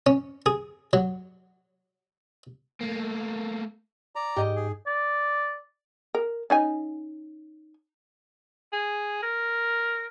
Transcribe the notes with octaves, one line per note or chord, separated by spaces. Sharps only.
C#4
G#4
F#3
A3 A#3
D5 A#5
G#2 G4 D#5
G#4
D5
A#4
C#4 D#4 G#5
G#4
A#4